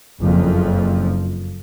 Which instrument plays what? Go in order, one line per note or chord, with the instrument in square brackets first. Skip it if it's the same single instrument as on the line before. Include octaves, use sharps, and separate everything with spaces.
[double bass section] F#1 F2 F3